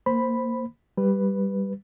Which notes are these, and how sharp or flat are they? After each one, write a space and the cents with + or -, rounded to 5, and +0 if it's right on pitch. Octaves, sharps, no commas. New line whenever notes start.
A#3 -10 C5 +0 B5 +0
G3 +0 B4 +0